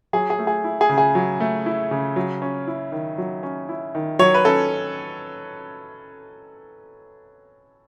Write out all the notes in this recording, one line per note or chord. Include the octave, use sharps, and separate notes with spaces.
F#3 G#4
G#4
A3
G#4
E4
G#4
C#3
G#4
F#3
A3
E4
C#3
F#3
C#4
E4
D#3
F#3
C#4
E4
D#3
F#3 C#5
B4
C#4 A4